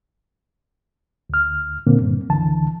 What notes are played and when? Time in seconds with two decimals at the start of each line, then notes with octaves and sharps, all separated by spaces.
1.30 D2 F6
1.87 A#2 D3 A#3 C4
2.01 G2
2.29 C#2 D3 E3 A5